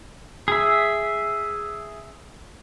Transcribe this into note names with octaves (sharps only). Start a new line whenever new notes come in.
G#4 E5